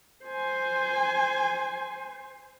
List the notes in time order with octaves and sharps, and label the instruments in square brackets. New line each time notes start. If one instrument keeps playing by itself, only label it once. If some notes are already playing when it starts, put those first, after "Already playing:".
[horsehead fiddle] C5 G#5